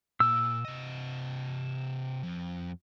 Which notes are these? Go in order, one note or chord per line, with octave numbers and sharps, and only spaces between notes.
A#2 E6
C3 D#5
F2